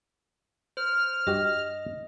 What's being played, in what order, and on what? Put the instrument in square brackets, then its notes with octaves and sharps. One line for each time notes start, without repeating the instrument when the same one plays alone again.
[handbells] C5 [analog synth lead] F6
[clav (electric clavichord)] G2 F#4 G4 [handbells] D#5